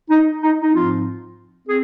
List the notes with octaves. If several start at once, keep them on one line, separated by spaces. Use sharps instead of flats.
D#4
D#4
D#4
G#2 F3 C4 F4
C4 G#4